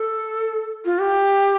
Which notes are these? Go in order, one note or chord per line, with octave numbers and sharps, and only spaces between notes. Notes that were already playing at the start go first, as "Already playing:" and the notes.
Already playing: A4
F4
G4